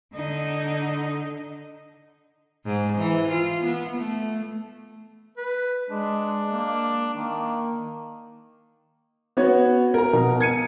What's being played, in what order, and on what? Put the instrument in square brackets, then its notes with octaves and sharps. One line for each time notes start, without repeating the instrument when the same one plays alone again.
[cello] D3 D#4
[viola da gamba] G#2
E3
F4
B3
A3
[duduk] B4
[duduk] G#3 [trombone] D4
[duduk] A#3
[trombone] D#3 [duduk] A#3
[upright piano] B3 F#4 C#5
A#4 A#5
B2
G#6 C#7 D#7